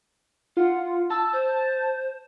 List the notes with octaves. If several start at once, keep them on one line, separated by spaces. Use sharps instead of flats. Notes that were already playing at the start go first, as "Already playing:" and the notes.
F4 F#5
A5 E6
C5